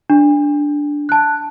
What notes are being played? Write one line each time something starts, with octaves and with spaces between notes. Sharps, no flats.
D4
A5 F#6